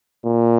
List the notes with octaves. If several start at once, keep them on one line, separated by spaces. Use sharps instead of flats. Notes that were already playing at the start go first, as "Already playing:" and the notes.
A#2